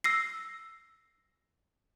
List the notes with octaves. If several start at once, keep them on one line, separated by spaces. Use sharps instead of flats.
E6 A#6 C7